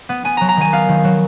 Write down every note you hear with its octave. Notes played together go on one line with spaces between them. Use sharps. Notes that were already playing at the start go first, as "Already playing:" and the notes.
B3
B3 G#5
F#3 A#5
A#5
D#3 G#5
B3 F5
D#3
F#3